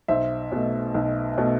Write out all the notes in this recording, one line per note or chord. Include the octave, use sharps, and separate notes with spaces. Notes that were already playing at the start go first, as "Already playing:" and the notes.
B1 C5 E5
B2 A3
B1
B2 A3